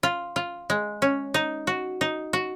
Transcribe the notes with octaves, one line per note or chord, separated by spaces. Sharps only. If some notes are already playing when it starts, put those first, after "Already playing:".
F4
F4
G#3
C#4
D#4
F#4
D#4
F#4